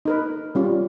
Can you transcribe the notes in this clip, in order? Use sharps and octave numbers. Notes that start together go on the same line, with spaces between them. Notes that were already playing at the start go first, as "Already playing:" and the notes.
D#4 A#4 B4
G3 C#4 F4